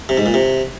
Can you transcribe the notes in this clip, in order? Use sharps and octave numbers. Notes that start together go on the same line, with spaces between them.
C3
G#2
A#2
C3